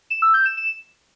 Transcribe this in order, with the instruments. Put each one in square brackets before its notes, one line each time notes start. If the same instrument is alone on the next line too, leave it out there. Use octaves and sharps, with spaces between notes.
[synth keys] E7
E6
G6
E7
E7